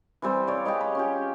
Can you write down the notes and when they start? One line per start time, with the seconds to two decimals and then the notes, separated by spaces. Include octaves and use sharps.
0.22 E3 G3 C4 C5
0.47 C#5 D5 F5
0.65 G4 G#4 B4 D#5
0.81 B5
0.95 C#4 F4 G4